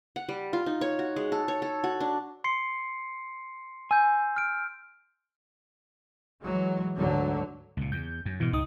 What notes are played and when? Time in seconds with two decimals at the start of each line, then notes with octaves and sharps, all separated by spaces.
0.16 F#5
0.29 G3
0.53 F4
0.66 D#4
0.81 C#5
0.99 F#4
1.16 G#3
1.32 A4
1.48 C#5
1.62 A4
1.84 F#4
2.00 D4
2.44 C6 C7 C#7
3.91 G#5 E6 G6
4.36 F6 D7
6.42 E3 F#3 G#3
6.96 D2 G#2 D3 F#3
7.77 C#2 A#2
7.92 E2 G6
8.26 F#2
8.40 G#2 B2 E3
8.53 C#2 D#4 D#6